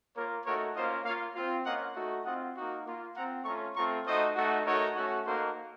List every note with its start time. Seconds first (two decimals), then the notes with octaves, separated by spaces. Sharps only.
0.16 A#3 F4 A#4 C#5
0.45 A3 D#4 F#4 A#4 C#5
0.75 A#3 C#4 F4 C5 D#5
1.05 A#3 F4 C#5 F5
1.35 C4 F4
1.66 A#3 C#4 F4 D#5 F#5
1.96 A3 D#4 F#4
2.25 C4 F4 D#5 F#5
2.56 A#3 D#4 F#4
2.85 A#3 F4
3.15 C4 F4 F#5 A#5
3.45 A3 C#4 F4 A#5 C#6
3.75 A3 C4 F4 A#5 C#6
4.05 A3 D#4 F#4 C5 D#5
4.35 A3 D#4 F#4
4.65 A3 D#4 F#4 A#4 C#5
4.95 A3 C#4 F#4
5.25 A#3 D#4 F#4 A4 C5